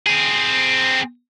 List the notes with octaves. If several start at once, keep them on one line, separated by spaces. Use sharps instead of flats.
C4 G#4